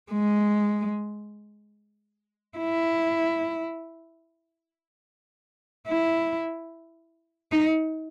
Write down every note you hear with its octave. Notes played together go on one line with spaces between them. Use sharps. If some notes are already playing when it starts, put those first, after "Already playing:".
G#3
E4
E4
D#4